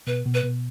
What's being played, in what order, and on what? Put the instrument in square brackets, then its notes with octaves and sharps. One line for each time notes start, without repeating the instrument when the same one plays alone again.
[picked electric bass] B2 [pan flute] B4
[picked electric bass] B2
[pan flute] B4
[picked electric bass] B2